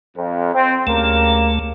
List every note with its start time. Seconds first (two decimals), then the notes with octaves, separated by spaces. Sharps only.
0.16 F2
0.54 C4
0.87 D2 G2 C#3 A3 A#3